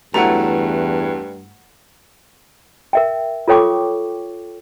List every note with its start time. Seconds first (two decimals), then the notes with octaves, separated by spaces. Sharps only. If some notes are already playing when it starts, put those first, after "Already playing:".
0.14 E2 G2 E3 F#3 A3 F#5 A#5
2.93 A#4 E5 G5
3.48 F4 A4 C#5 G5 C#6 D6